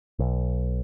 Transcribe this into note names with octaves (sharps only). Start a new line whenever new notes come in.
B1